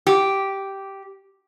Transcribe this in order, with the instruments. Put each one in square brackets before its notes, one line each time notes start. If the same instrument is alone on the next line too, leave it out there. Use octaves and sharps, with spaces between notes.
[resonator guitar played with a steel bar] G4